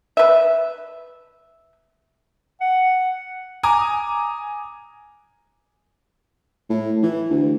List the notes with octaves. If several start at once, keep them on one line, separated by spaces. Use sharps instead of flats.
B4 E5
F#5
G#5 A#5 D6 D#6
A2
E3
D2